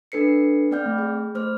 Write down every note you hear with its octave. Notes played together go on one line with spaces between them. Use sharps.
D4 A4 B4 C7 C#7
C4 D5 G5 F6 G6
A3
G#4
A3 C5 F6